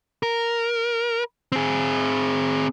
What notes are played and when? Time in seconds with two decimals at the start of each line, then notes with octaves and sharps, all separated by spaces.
0.23 A#4
1.52 C4 G#4